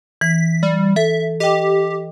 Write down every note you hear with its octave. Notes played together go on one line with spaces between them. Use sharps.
E3 B6
G3
A4 E5
G4 D#5 G5